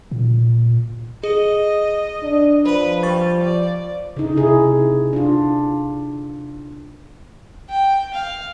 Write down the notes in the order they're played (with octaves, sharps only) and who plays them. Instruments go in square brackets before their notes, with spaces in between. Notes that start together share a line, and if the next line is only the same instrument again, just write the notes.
[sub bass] A#2
[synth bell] G#4 [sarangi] D#5
[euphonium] D4
[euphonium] F3 [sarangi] B4 [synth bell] C5 B5
[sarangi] G3 [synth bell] C#6 A6
[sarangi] D5
[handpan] C#3 D#4
C3 E4 G#4
D4 F4
[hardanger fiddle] G5
F5